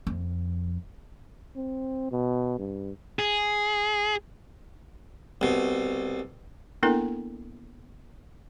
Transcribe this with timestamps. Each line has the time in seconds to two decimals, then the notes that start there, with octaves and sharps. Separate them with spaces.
0.07 F2
1.56 C4
2.11 B2
2.59 G2
3.19 G#4
5.41 C2 B2
6.83 A#3 B3 D4 E4 A4 A#4